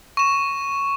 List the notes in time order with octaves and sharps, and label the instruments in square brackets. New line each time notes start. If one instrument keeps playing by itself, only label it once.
[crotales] C#6 E7